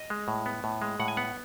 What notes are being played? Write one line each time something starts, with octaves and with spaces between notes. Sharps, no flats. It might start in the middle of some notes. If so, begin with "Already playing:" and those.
Already playing: D#5
G#3
A2
B3
A2
G#3
A2 F#5
G#5
B3 F#5